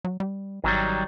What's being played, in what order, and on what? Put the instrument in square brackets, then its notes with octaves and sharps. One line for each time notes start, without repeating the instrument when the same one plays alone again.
[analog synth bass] F#3
G3
[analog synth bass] G#1 [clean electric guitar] D#3 F#3 G3